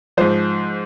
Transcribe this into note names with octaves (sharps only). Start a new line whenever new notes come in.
G#2 F3 C5